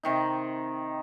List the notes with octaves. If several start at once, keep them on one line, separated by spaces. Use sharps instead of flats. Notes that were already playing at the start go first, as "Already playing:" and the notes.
C3 D#3 D#4